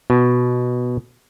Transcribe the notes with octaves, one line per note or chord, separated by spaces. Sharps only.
B2